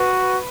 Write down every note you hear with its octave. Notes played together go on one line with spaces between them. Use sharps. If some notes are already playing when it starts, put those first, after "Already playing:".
Already playing: F#4 B4